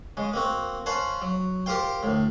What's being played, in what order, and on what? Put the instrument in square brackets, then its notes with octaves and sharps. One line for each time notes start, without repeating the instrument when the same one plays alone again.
[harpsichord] C#3 G#3
A#3 C4 F#4
C#4 C5 F5 F#5 A5
F#3
F4 G4 A#4 C5 F5 G5
D2 A2